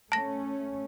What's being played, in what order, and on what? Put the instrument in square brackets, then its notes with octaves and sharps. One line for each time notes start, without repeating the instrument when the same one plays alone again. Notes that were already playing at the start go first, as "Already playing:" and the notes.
[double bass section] A3 C#4 [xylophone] A5 A#6